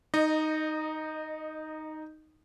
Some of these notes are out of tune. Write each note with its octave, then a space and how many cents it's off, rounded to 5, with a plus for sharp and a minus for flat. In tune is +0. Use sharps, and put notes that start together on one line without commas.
D#4 +0 D#5 -20